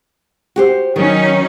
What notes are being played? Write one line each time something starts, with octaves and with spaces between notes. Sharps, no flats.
F#4 G4 C5
D#3 F#3 C#4 D#4 C#5